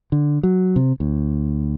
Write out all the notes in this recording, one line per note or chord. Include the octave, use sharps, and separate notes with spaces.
D3
F#3
C3
D2